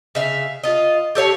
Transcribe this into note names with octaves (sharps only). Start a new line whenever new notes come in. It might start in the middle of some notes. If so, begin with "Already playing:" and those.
C#3 E5 F5
F4 D#5
G4 A4 C#5 F5